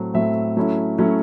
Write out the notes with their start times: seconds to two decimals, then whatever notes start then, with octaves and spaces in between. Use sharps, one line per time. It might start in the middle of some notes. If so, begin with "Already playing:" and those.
Already playing: A2 F#3 A3 C4
0.14 A2 F#3 A3 C4 E5
0.57 F#3 A3 C#4 E4
0.98 F#3 A3 C#4 E4